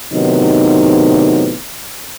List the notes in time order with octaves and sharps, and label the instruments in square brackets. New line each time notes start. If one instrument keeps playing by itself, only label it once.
[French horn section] A2 C3 D#3 F#3 B3 D#4